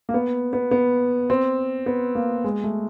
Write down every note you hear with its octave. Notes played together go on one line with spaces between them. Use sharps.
A#3
B3
B3
B3
C4
B3
A#3
G#3
A3